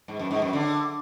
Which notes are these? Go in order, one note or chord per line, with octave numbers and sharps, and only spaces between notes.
G#2
F#2
G#2
F#2
D3